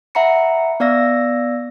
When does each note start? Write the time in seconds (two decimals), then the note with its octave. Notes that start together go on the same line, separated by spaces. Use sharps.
0.15 E5 F#5 A#5 B5 C#7
0.80 B3 D5 F5 E6 A#6